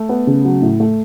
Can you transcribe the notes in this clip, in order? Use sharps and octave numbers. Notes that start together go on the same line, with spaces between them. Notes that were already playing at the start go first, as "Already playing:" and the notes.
Already playing: A3
B3
C#3
F#3
A2
A3